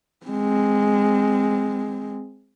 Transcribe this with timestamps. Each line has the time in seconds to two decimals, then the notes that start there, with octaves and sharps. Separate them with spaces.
0.26 G#3 C4